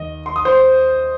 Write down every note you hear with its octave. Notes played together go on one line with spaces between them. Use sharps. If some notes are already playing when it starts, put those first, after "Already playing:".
Already playing: D#2 D#3 D#5
C6
D#6
C5 C6